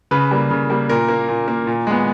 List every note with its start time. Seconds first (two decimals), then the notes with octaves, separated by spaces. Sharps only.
0.11 C#3 B4
0.31 G3 A#3
0.50 C#3
0.70 G3 A#3
0.89 A#2 A#4
1.09 A#3
1.28 A#2
1.48 A#3
1.67 A#2
1.87 G#3 B3